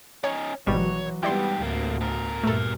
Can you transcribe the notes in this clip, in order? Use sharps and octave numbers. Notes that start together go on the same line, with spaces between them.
C#4 D#4 C#5
G#1 B2 E3 F#3 G3 C#5
G#2 G3 B3 E4 G4 D5 C6
D2 A2 C3 A#3
B2 A#4
G2 A#2 A3 A4